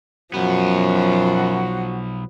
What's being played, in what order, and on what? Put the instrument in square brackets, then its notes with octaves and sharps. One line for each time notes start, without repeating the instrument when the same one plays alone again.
[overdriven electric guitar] B1 B3 [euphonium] F#2 [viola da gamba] F3 F#3 [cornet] F#4